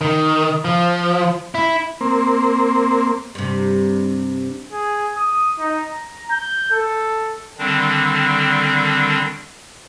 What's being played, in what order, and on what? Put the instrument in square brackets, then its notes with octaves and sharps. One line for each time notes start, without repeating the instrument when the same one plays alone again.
[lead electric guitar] D#3
F3
E4
[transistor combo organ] A#3 C4
[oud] G2 C3
[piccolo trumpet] G#4
D#6
D#4
A#5
G6
A4
[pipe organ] D3 D#3 G3 C4 D4